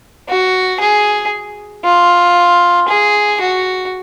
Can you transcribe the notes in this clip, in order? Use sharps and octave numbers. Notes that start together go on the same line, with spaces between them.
F#4
G#4
F4
G#4
F#4